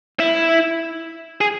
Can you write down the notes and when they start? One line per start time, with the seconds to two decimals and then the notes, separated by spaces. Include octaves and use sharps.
0.20 E4
1.41 G#4